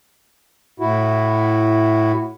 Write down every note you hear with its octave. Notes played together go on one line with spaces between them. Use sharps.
A2 E4 F#4